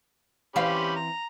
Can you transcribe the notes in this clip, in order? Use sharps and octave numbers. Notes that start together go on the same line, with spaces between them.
E3 C4 C#4 G4 F5 B5
A#5